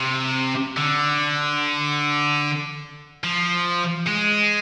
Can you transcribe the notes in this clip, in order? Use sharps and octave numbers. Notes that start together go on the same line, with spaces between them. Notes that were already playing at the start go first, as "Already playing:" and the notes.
Already playing: C3
D3
F3
G#3